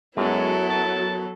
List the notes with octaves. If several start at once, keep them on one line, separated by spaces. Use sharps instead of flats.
F#2 F#3 G#3 B3 E4 A4
A5